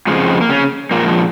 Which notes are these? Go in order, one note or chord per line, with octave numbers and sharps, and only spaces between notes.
F2 C#3 F3 G#3
G#3
A#3
C#3 C#4
A#2 F3 G#3 A#3